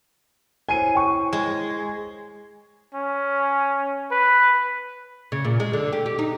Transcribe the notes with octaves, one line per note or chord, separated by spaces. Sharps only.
E4 C5 C#5 G#5 D#7
G5 C#6
G#3
C#4
B4
C#3
A#2
G#3
D3
G4
G4
D#4